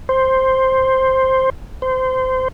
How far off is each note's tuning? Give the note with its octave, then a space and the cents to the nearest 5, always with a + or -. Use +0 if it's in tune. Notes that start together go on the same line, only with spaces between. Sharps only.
C5 +5
C5 -20